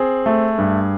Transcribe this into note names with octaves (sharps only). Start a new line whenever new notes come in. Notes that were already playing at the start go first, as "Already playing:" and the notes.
Already playing: C4 G#4
A3
G2